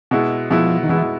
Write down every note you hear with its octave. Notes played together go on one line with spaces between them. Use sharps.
B2 G#3 B3 E4
B2 F3 G#3 B3 E4
D#3
B2 E3 G#3 B3 E4